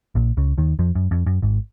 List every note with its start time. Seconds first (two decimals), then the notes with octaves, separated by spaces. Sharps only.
0.15 A#1 A#2
0.37 C#2 C#3
0.58 D#2 D#3
0.79 F2 F3
0.95 F#2
1.11 F2
1.26 F#2
1.42 G#1 G#2